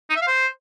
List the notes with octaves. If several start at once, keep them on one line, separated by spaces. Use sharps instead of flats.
D#4
E5
F5
C5